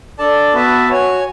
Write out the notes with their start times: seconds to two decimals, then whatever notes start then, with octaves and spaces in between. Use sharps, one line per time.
0.19 D4 A4 D5 A5
0.53 B3 F#4 B4 E5 A5
0.89 F#4 C#5 G#5